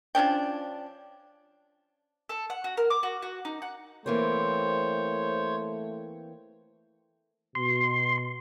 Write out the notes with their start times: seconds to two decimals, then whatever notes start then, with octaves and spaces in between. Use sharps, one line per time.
0.15 F3 C#4 D4 G5
2.29 A4
2.50 F#5
2.64 F#4
2.77 A#4
2.90 D6
3.03 F#4
3.22 F#4
3.45 D#4
3.62 F#5
4.06 E3 A3 A#3 C4 C5 C#5
7.55 B2 C6